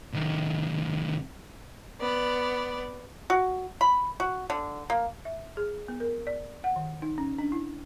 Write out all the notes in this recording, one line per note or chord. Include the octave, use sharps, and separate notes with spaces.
C2 D#3
B3 D5
F#4
B5
F#4
D3
A#3
E5
G#4
B3
A#4
D5
F#5
D#3
D#4
C#4
D4
E4